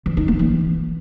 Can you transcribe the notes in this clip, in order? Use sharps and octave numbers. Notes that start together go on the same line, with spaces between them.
E3
D#4
A#3
E3